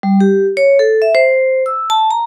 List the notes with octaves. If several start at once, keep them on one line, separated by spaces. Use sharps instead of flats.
G3
G4
C#5
A4
E5
C5
E6
A5
A#5